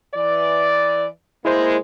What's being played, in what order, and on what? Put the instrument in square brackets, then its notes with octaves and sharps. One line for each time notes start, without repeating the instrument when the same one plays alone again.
[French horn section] E3 D5
[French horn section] G#3 A#3 [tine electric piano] E4 C5